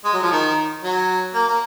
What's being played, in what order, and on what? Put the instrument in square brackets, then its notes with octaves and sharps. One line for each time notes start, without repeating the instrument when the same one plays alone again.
[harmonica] G#3
F#3
F3
D#3
F#3
A#3
A#3